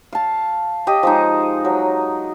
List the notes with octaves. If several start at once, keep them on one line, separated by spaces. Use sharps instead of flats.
F5 A5
G4 D#5
F3 G#3 D#4
F#3